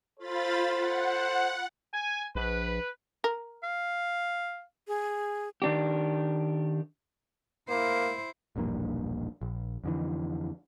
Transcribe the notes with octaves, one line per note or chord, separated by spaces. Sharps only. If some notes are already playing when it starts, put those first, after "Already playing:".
F4 A4 C5 B5 A6
F#5
G#5
A#1 B4
A#4
F5
G#4
D#3 D4 G4
A#3 E4 C5
E1 A#1 G2 A#3
A#1
F2 D3 E3